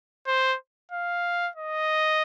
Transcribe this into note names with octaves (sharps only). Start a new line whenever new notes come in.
C5
F5
D#5